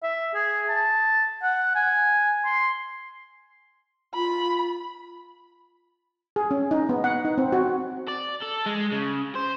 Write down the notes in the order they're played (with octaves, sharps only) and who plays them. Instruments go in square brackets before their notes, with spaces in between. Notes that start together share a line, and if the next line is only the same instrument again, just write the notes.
[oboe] E5
G#4
A5
F#5
G#5
C6
[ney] F4 [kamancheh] B5
[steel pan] G#4
C#4
D#4
B3
F#5
D#4
C4
F#4
[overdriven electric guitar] D5
A4
G#3
C#3
C5